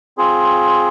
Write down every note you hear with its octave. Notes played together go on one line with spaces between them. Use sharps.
C4 F4 G#4